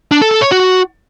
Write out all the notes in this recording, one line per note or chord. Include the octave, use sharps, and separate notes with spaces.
D4
A4
A4
C#5
F#4